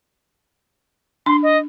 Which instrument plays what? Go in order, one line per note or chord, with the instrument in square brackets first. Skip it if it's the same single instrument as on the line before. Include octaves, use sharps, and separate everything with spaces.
[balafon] D4 [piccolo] C6
[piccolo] D#5